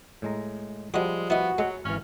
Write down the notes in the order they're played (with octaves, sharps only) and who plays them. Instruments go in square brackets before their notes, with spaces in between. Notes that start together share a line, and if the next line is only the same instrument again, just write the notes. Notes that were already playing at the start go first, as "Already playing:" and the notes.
[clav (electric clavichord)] A2 G#3 A#5
[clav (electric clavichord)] F3 G3 [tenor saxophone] G#3 [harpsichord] F#4 D#5
[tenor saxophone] B3 [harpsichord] E4 D#5 [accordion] F#4
[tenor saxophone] F#3 [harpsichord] G#3
[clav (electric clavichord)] G#1 E3 [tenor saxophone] C#4 [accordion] F6